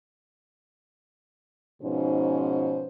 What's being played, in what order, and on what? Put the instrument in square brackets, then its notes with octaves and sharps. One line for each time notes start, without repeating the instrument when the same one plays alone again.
[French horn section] G#2 B2 F3 C#4 D#4 C5